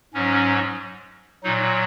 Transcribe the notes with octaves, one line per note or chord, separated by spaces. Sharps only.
G#2 F#3 C#4
A#2 F#3 D#4